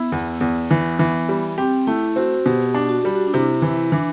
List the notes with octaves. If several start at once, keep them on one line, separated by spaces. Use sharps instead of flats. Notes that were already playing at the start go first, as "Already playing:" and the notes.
Already playing: B3 E4
E2
E2
E3
E3
G3
C4 G4
A3 E4
C4 F#4
B2 G4
D4
F#4
G3 G4
F#4
D4
C3 E4
E3 E4
E3 D4